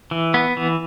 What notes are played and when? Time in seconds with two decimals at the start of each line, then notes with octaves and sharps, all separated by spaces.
0.11 E3
0.34 B3
0.57 E3